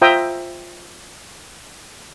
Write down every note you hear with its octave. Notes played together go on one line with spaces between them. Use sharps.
F4 C5 E5 G5 A#5 D#6